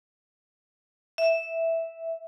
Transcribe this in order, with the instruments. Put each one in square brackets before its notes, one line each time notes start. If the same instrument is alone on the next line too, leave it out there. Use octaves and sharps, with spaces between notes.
[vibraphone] E5